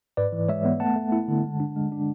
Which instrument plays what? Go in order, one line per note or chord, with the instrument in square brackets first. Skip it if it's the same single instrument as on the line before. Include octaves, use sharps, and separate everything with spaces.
[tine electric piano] G#2 B4 D5
E3
G#3 C#5 E5
B3
A3 F#5 A5
A3
E4
D3
G#3
D4
G#3
D4